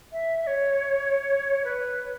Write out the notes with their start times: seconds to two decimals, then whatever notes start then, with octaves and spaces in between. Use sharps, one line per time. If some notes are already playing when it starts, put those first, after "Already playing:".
0.12 E5
0.42 E5
0.47 C#5
1.64 B4